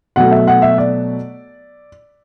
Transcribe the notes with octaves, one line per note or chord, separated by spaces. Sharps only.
B2 F#3 A3 F#5
E5
F#5
E5
D5